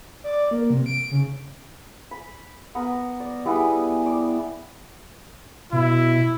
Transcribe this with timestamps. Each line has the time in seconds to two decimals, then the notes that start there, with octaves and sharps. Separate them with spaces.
0.24 D5
0.51 A#3
0.70 C3
0.86 D7
1.11 C#3
2.11 B5
2.75 B3 A#4
3.20 D5
3.45 G3 B3 E4 G#4
4.06 D5
5.73 B2 E4